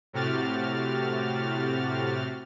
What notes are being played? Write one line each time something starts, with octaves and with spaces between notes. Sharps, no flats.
A2 C3 F#4 G4 F6 A6